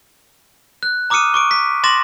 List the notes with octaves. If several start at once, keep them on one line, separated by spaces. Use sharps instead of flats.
F#6
A#5 D6 D#6 F6 C#7 D#7
C#6 D6 D7
B6
C6 D6 A6 A#6 E7 F#7